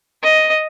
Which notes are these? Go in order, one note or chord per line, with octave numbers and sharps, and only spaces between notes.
D#5